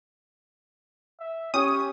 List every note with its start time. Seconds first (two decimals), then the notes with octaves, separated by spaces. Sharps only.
1.20 E5
1.54 C#4 G4 C#5 D#6